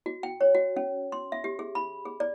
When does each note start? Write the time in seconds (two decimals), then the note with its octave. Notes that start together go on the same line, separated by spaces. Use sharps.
0.06 F#4
0.23 G5
0.41 C#5
0.55 F#4
0.76 C#4
1.12 C6
1.32 E5
1.44 G4
1.59 G#4
1.75 B5
2.05 G#4
2.20 D5